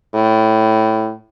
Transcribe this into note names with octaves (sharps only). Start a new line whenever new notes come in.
A2